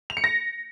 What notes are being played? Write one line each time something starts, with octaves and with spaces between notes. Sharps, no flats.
F7
C#7
A#6